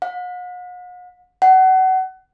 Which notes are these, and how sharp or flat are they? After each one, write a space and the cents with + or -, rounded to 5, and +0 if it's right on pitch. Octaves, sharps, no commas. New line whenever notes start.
F#5 -45
F#5 +25